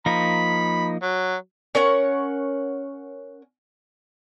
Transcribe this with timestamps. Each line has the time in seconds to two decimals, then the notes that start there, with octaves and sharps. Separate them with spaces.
0.06 F3 A#3 D#4 B5
1.03 F#3
1.75 C#4 A#4 C#5 F#5